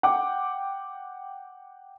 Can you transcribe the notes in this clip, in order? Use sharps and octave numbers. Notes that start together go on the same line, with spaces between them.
F#5 G5 D6